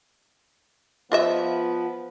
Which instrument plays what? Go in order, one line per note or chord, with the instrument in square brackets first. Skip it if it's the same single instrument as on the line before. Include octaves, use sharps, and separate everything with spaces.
[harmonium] F3 [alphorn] B3 [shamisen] F4 D#5 E5